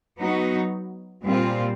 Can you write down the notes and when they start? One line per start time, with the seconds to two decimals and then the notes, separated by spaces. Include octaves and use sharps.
0.18 F#3 B3 D#4 F#4
1.24 A#2 G3 C4 F4